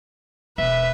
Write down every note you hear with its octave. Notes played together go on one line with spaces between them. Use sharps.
E1 B4 E5